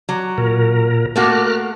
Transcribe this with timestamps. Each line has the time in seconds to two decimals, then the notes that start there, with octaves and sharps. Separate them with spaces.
0.09 F#3
0.38 A#2 A#4
1.16 A3 A#3 F#4 A#4 F6 F#6